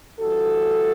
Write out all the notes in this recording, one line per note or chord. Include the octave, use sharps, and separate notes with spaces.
G2 E3 G3 F#4 A4